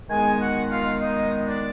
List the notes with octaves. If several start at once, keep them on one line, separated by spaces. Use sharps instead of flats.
D#3 G#3 B3 G#4 G#5
F#4 F#5
F4 F5
D#4 D#5
D4 D5